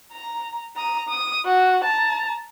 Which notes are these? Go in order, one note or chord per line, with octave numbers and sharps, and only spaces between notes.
A#5
A#5 D#6
D#6
F#4
A5 A#5